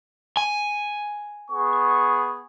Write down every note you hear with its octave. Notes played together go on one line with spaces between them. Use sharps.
G#5
B3 G#4 C#6